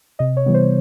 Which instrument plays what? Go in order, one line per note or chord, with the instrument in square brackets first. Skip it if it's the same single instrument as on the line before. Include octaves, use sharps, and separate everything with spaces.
[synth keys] C3 D#5
C#5
E3 G3 B3
C5